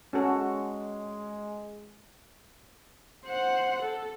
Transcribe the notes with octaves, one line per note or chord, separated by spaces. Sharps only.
G#3 C#4 F#4 A4
C5 F#5
A4